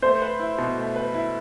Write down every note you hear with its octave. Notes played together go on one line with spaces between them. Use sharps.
A3 C5
B4
E4
B2
A3
B4
E4